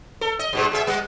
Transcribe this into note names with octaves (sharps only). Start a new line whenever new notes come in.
A4
D#5
G2 B2 G#3
B2 G#4 E5
G3 B3